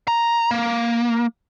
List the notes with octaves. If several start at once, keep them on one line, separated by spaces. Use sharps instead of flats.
A#5
A#3